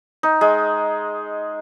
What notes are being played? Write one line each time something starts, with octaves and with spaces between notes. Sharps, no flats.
D#4
G#3